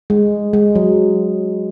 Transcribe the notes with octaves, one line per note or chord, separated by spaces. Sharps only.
G#3
G#3
F#3